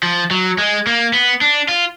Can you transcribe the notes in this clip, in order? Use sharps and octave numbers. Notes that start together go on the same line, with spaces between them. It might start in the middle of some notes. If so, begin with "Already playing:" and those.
F3
F#3
G#3
A#3
B3
D4
F4